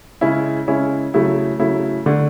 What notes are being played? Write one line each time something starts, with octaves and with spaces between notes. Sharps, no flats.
C#3 G#3 C#4 E4
C#3 G#3 C#4 E4
C#3 F#3 A3 E4
C#3 F#3 A3 E4
D3 A3 D4